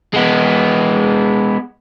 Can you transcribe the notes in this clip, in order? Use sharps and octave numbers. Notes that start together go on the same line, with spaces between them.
G#3 B3